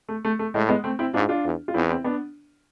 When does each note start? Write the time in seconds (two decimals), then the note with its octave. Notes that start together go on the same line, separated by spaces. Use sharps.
0.08 A3
0.24 A3
0.39 A3
0.54 A2 G#3
0.69 G#3 B3
0.84 A3 C4
0.99 C4 E4
1.14 G#2 D4 F4
1.29 D4 F4
1.44 E2
1.68 F4
1.74 E2 C4 E4
1.89 C4 E4
2.04 B3 D4